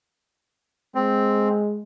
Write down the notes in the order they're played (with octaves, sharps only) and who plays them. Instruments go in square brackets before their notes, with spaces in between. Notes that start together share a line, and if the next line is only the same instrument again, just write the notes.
[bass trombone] G#3 [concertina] C4